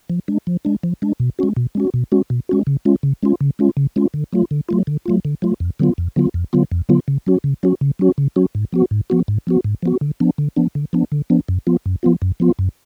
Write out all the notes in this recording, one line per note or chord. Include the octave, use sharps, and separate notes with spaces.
F3
G#3 D4
F3
G#3 D4
F3
G#3 D4
B2
G#3 C#4 F#4
B2
G#3 C#4 F#4
B2
G#3 C#4 F#4
B2
G#3 C#4 F#4
C#3
G#3 C#4 F4
C#3
G#3 C#4 F4
C#3
G#3 C#4 F4
C#3
G#3 C#4 F4
D3
F#3 A3 F4
D3
F#3 A3 F4
D3
F#3 A3 F4
D3
F#3 A3 F4
F2
D3 F#3 B3 F4
F2
D3 F#3 B3 F4
F2
D3 F#3 B3 F4
F2
D3 F#3 B3 F4
C#3
F#3 C#4 F#4
C#3
F#3 C#4 F#4
C#3
F#3 C#4 F#4
C#3
F#3 C#4 F#4
G#2
F3 B3 F#4
G#2
F3 B3 F#4
G#2
F3 B3 F#4
G#2
F3 B3 F#4
D3
F3 B3 D4
D3
F3 B3 D4
D3
F3 B3 D4
D3
F3 B3 D4
F#2
F3 B3 F4
F#2
F3 B3 F4
F#2
F3 B3 F4
F#2